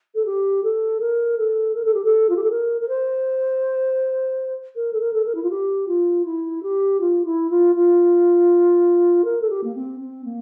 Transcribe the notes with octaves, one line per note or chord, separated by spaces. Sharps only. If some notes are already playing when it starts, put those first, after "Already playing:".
A4
G4
A4
A#4
A4
A#4
A4
G4
A4
F4
G4
A4
A#4
A#4
C5
A#4
A4
A#4
A4
A#4
E4
F4
G4
F4
E4
G4
F4
E4
F4
F4
A#4
A4
G4
A#3
C4
C4
A#3